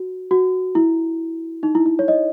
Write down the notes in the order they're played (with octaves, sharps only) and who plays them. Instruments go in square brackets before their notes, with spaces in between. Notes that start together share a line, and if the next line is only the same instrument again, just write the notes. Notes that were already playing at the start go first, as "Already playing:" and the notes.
Already playing: [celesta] F#4
F#4
E4
D#4
E4
E4
C#5
D#5